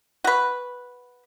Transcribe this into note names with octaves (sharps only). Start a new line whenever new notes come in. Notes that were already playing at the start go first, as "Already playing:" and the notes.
F#4 B4